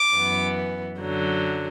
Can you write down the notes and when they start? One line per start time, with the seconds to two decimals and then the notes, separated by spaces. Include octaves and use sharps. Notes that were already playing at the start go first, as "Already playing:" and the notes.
Already playing: D6
0.14 F#2 E3 B3
1.00 F#2 D3 F#3